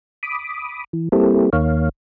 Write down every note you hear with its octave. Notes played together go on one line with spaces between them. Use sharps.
B5 D6 D#6
E3
G3 A#3 C4 E4 G4 A4
D#2 D#3 A#3 C#5 F5